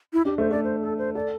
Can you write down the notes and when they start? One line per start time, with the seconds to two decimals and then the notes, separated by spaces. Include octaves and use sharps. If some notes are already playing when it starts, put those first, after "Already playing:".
0.13 E4
0.25 D4 G4
0.38 A3 C5
0.51 A3 D5
0.64 C5
0.82 A4
0.98 C5
1.15 A4 D5